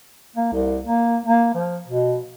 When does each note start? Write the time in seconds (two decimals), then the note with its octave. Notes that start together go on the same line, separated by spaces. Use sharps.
0.36 A#3
0.53 C2
0.85 A#3
1.26 A#3
1.54 F3
1.88 B2